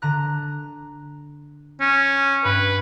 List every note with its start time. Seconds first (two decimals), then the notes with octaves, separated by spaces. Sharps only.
0.02 D3 A#5 F#6
1.81 C#4
2.45 G2 B4